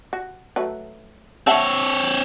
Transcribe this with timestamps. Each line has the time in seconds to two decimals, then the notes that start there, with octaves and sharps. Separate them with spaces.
0.13 F#4
0.56 F#3 A3 B4
1.47 C4 C#5 E5 F#5 A5